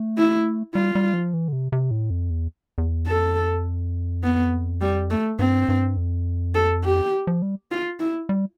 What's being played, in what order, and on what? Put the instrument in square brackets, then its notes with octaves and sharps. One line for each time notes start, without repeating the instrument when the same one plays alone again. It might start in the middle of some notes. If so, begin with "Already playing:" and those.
Already playing: [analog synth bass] A3
[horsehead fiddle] E4
[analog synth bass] G3 [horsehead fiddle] F4
[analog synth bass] G3
F3
E3
D3
C3
C3
A2
F2
E2
E2
[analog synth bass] F2 [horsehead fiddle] A4
[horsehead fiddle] B3
G3
A3
[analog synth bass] G2 [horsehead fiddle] C4
[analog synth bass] G2
F2
[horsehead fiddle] A4
G4
[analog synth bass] F3
G3
[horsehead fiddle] F4
E4
[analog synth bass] G3